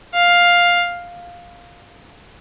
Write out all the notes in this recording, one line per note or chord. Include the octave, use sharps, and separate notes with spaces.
F5